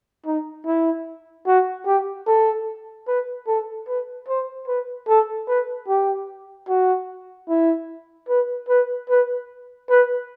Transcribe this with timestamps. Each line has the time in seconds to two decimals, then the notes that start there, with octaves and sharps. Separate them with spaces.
0.26 D#4
0.66 E4
1.47 F#4
1.86 G4
2.27 A4
3.07 B4
3.47 A4
3.88 B4
4.28 C5
4.68 B4
5.08 A4
5.48 B4
5.88 G4
6.68 F#4
7.49 E4
8.29 B4
8.69 B4
9.09 B4
9.90 B4